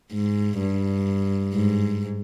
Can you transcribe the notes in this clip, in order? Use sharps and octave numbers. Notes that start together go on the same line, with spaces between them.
G#2
G2
G#2